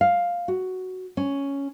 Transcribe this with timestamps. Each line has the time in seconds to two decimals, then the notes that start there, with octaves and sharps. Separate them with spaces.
0.01 F5
0.48 F#4
1.17 C#4